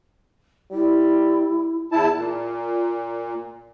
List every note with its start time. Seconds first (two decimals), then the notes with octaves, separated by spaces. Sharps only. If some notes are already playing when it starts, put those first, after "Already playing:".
0.72 G3 E4
1.92 E2 E4 A5
2.15 A#2